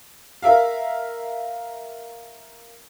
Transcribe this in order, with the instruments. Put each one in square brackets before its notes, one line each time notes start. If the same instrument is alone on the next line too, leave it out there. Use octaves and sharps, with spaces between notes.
[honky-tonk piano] A#4 E5 F5